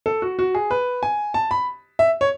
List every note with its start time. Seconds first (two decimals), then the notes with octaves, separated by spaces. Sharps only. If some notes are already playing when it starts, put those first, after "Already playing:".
0.06 A4
0.22 F#4
0.39 F#4
0.55 G#4
0.71 B4
1.03 G#5
1.34 A5
1.51 B5
1.99 E5
2.21 C#5